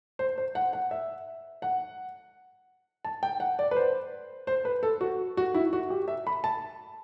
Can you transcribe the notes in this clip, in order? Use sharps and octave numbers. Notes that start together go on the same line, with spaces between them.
C5
C5
F#5
F#5
E5
F#5
A5
G5
F#5
D5
B4
C5
C5
B4
A4
F#4
F#4
E4
F#4
G4
E5
B5
A5